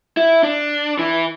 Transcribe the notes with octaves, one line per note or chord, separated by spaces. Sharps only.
E4
D4
E3